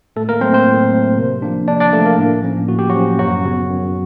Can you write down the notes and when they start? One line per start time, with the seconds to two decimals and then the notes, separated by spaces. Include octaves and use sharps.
0.16 A2 A3 A4
0.29 A#3 A#4
0.41 F#3 A3 C4 C5
0.54 C4 C5
0.67 A2
0.92 F#3 A3
1.17 C3
1.42 F3 A#3 D4
1.68 C3 D4 D5
1.80 D4 D5
1.93 F3 A3 A#3 D4 A4
2.05 A#3 A#4
2.18 A2
2.43 F3 A#3 C#4
2.68 A2 F#4
2.79 G4
2.89 F#3 F#4
2.94 F3 A#3 C#4
3.19 F#2 F#3 F#4
3.44 C#3 F#3 B3
3.69 F#2